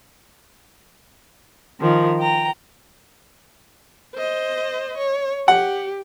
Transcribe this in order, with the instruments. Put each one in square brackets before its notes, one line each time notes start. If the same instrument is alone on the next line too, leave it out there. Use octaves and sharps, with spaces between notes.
[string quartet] D#3 F3 A#4
G5 A#5
[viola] C5 D#5
C#5
[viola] G4 [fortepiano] F#5